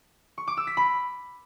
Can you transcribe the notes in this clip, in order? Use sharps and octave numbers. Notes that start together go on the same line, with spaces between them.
C#6
D6
E6
B6
B5